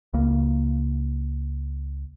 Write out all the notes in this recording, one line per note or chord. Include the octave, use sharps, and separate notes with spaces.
C#2 C#3 A#3